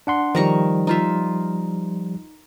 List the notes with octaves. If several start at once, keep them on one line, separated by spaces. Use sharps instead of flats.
D4 F#5 C6
D#3 F3 G3 A#5 C#6
D#4 F4 E5